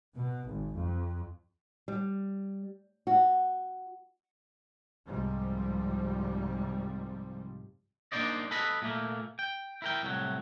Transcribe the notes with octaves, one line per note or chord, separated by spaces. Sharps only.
B2
G#1
F2
G3
F#4
C2 G#2 C3 F3 G3
A#3 D4 D#4 C5 D5 D#5
A4 B4 D#5 B5
A#2 A3 A#3
G5
E4 A#4 G5
C2 A2 F#3